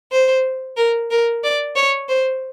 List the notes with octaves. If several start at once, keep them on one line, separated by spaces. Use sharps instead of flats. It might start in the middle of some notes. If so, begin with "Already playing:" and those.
C5
A#4
A#4
D5
C#5
C5